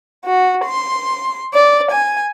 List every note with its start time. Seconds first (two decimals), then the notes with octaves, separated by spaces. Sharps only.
0.25 F#4
0.66 C6
1.54 D5
1.92 G#5